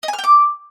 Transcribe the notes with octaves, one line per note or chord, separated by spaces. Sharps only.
D#5
G#5
F6
G5
D6